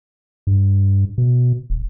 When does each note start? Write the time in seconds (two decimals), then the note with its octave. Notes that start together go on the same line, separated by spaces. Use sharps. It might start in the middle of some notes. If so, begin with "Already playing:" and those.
0.47 G2
1.18 B2
1.70 D#1